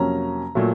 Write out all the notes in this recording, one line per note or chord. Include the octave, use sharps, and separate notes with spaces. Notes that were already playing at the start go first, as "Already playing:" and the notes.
Already playing: F2 C3 F#3 A#3 C#4 A#5
A#2 F#3 A3